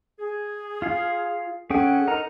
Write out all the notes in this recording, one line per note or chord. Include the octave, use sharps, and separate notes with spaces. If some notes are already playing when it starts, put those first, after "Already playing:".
G#4
F4 F5
C#4 G#4 A4 F#5 G5
D#4 A#4 A#5